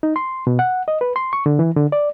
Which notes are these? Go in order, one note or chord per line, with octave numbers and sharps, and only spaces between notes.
D#4
C6
B2
F#5
D#5
B4
C6
C#6
D3
E3
D3
D5